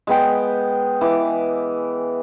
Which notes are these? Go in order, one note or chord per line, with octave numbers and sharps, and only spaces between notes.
G#3 B3 G5
E3 D6